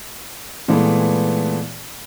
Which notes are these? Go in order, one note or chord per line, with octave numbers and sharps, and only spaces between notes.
A#2 E3 G#3 A3 B3